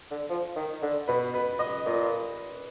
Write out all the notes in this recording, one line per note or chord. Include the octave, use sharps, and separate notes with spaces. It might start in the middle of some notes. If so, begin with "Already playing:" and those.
D3
F3
D#3
D3
B2 B4
B4
D#5
A#2